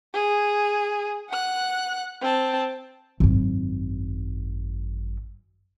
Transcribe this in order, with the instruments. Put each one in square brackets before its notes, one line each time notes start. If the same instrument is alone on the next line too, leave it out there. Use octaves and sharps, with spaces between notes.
[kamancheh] G#4
F#5 F#6
C4 A5
[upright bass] G#1 F#2